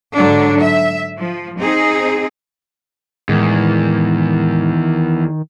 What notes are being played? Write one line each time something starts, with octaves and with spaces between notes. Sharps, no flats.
G#2 D3 F#3 D4
E5
F3
C4 D#4 G#4
E2 A2 D#3 G#3